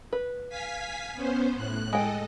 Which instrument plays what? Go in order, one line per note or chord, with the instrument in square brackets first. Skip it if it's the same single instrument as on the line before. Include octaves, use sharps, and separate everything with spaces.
[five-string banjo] B4
[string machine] F5 G#5 B6
B3 C#4 C5
A2 F#6
[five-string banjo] G#3 G5 [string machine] A4 D#5